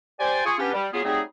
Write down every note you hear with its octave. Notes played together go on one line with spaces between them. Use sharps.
G4 C5 D5 G#5
F4 G#4 G#5 C#6
B3 C#4 D4 G4
G3
C#3 F#3 B3 F4 G#4
F#3 G3 A3 C4 D#4 G#4